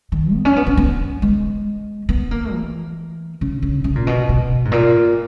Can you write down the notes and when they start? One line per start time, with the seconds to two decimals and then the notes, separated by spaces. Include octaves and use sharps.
0.12 D#3
0.33 B3
0.45 C#4
0.56 B3
0.67 B3
0.77 B3
1.22 G#3
2.09 B3
2.31 A#3
2.53 E3
3.41 C#3
3.62 C#3
3.84 C#3
3.95 A#2
4.07 B2
4.29 B2
4.65 G#2
4.72 A#2